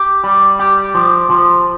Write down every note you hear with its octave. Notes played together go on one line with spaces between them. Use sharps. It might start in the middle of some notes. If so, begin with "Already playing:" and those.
Already playing: G4
G3
G4
F3
F3